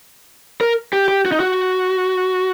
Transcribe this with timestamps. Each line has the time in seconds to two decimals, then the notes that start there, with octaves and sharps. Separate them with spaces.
0.61 A#4
0.93 G4
1.08 G4
1.25 F#4
1.32 D#4
1.40 F#4